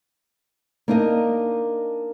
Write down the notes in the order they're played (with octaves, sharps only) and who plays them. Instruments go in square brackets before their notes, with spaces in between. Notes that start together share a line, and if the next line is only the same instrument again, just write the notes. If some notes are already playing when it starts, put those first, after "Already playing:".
[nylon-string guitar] A#3 D4 D#4 A#4 D#5